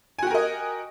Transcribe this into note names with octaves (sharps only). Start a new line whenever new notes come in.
F#4 G4 A#4 D#5 G#5